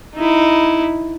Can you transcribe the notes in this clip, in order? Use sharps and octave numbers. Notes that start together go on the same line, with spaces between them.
D#4 E4